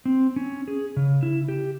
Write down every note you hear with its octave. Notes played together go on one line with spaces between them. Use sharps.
C4
C#4
G#4
C#3
E4
G4